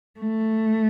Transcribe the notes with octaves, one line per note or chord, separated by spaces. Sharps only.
A3